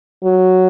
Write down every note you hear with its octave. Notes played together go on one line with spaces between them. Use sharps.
F#3